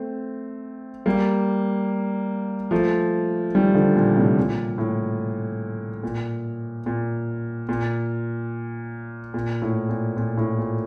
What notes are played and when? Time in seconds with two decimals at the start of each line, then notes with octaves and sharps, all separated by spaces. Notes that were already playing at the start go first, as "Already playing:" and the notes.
Already playing: A3 C4
1.06 G3 A#3
2.71 F3 A3
3.55 D#3 G3
3.75 D3 F3
3.96 A#2
4.16 A2 C3
4.37 A#2
4.78 A2
6.03 A#2
6.86 A#2
7.69 A#2
9.34 A#2
9.62 A2
9.89 A#2
10.17 A#2
10.37 A2
10.58 A#2